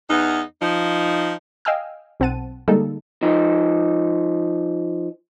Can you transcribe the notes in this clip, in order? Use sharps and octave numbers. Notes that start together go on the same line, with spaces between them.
E2 B3 D#4
F3 D#4
D#5 F5 G5 G#5 E6 F6
B1 C4 F#5 A5 D#7
D3 G3 G#3 A#3 D#4 A4
F3 D#4